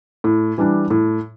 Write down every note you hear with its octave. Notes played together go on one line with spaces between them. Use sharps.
A2
E3 G3 D4
A2